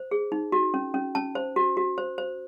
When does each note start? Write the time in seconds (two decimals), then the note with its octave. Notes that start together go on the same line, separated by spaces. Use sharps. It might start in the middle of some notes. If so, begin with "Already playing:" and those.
Already playing: C5
0.11 G#4
0.32 D#4
0.52 F#4
0.74 C#4
0.94 C#4
1.15 C#4 A5
1.35 C5
1.56 F#4
1.77 F#4
1.98 C5
2.18 C5